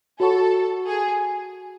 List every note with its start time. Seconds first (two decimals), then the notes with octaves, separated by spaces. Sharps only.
0.19 F#4 A4 C#5 F#5 C#6
0.86 G#4